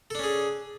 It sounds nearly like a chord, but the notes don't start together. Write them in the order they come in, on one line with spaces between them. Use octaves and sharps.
A4 D4 C#4 G#4